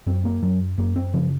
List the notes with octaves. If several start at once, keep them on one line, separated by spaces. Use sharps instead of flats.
F#2 C4
A#3
F#2 F#3
F#2 A#3
C4
C#3 F3